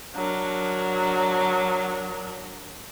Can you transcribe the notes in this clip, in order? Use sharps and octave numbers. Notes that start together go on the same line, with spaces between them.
F#3 D4 A#4